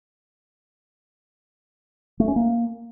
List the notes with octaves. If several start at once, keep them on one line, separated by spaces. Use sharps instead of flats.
A3
C#4
A#3